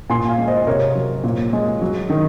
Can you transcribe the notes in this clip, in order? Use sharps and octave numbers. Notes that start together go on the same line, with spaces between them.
A#2 G#5 C6
F5 G#5
G#3
C5 D#5
C3 A#4 C#5
F#3
A#2
G#3
F#3
D#3